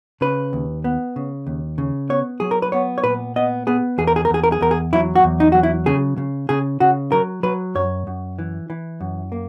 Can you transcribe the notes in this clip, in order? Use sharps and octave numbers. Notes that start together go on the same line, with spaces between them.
C#3 B4
D#2
B3
C#3
D#2
C#3
B3 C#5
F#3 G#4
A#4
B4
B3 C#5
C#5
A#2 B4
B3 D#5
B3 G#4
E2 G#4
A#4
G#4
A#4
E2 G#4
A#4
G#4
E2 A#4
G#4
F#3 E4
F#4
E2
D#4
F#3 F#4
E4
C#3 G#4
C#3
C#3 G#4
C#3 F#4
F#3 A#4
F#3 B4
F#2 C#5
F#2
E3
E3
F#2
A#3